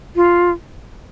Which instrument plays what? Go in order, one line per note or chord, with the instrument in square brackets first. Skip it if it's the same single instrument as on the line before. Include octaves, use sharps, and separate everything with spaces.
[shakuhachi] F4